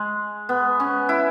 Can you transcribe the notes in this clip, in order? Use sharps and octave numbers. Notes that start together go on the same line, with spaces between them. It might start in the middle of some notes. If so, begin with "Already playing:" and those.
Already playing: G#3
B3
C#4
E4